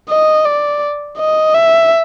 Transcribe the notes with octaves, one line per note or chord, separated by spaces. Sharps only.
D#5
D5
D#5
E5